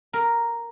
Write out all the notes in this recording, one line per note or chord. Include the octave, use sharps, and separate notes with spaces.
A#4